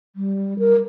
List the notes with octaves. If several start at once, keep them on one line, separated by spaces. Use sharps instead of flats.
G3
A#4